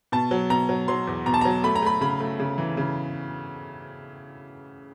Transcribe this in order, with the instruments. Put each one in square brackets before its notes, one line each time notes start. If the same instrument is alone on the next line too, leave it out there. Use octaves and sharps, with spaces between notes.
[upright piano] B2 A5
F#3
B2 A#5
F#3
F#3 C6
E2
B2 A#5
A5
A#5
F#3
A3 B5
A#5
A3 B5
C#3 B5
A3
C#3
E3
C#3